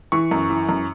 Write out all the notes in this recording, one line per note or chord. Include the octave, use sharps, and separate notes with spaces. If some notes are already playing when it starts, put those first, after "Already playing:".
E3 C#6
F#2
E3
F#2